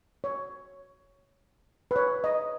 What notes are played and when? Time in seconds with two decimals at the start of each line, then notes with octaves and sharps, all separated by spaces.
0.24 C#5
1.91 B4
1.96 C#5
2.24 D#5